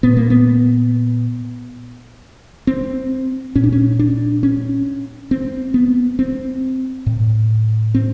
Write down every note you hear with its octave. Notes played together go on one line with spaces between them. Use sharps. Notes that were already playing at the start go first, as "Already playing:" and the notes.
A#2 B3
A#3
B3
C4
A#2 C#4
D4
C#4
D4
C#4
C4
B3
C4
A2
C4